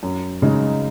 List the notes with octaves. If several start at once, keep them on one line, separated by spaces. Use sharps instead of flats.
F#2
C#3 G#3 D#4